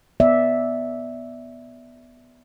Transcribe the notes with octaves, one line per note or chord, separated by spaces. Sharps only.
B3 D5 E5